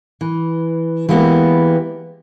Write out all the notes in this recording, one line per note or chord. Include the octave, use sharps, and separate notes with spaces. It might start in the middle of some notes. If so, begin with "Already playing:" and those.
E3
E3 G#3 A#3 B3 G4